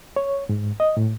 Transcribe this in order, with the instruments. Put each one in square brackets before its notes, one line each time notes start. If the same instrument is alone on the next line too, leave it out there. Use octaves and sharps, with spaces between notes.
[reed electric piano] C#5
G#2
D#5
A2